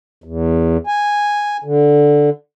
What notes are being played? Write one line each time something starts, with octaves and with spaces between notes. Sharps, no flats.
E2
G#5
D3